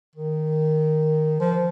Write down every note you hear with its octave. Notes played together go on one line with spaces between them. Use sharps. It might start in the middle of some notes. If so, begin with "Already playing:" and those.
D#3
F3